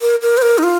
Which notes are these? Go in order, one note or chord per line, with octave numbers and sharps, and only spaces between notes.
A#4
A#4
C5
A#4
D#4
F4